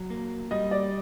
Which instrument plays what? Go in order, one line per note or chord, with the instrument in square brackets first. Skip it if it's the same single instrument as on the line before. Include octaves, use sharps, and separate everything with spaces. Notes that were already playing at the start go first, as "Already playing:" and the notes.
Already playing: [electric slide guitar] F#3
A#3
[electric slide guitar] G3 [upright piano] D#5
[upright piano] D5